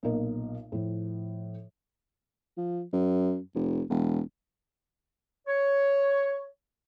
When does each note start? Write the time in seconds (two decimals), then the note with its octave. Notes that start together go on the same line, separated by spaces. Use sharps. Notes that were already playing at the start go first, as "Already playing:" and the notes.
0.03 B1 A#2 A#4 D#5
0.72 A2 F3
2.58 F3
2.93 F#2
3.55 F1
3.90 E1
5.48 C#5